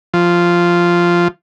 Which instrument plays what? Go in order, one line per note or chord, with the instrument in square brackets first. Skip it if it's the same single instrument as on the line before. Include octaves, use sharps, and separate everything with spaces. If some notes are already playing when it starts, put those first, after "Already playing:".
[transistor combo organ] F3